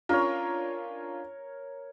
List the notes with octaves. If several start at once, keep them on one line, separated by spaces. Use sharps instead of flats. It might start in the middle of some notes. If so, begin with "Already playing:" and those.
C#4 D4 F4 A#4 C#5